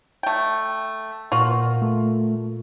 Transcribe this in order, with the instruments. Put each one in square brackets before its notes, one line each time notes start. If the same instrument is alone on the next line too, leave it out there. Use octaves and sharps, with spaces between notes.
[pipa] A3 G5
[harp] A#2 [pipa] F4 F#4
[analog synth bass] A3